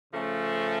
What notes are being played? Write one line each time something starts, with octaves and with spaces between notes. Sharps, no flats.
C#3 F3 A3 C#4